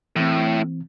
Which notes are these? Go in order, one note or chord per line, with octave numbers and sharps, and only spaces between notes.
A2 E3 C4